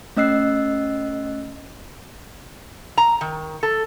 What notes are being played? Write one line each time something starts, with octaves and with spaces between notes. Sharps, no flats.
A3 C#4 D#5 E6 F#6 C7
A#5
D#3
A4